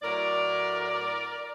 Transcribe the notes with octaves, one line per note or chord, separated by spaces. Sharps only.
A2 F#3 A#4 D5